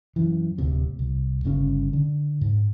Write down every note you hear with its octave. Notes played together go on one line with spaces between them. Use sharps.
F#2 E3
D1 D2 C3
C2
G1 C#3 C#4
D3
G#2